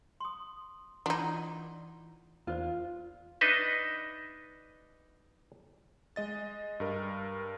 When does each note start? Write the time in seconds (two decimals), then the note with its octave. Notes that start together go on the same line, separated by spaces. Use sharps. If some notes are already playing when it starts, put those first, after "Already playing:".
0.20 C6 D#6
1.06 E3 D4 D#4 F4 F#5 C6
2.47 E2 F4 A#4 C5 D5
3.41 D4 D#4 B4 D#5 E5
6.16 G#3 D#5 A6
6.80 G2 A#4